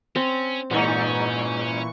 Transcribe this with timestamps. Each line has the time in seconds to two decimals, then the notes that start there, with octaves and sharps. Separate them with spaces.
0.16 C4 C#4
0.71 G2 A#2 E3 C#4 D#4 C#6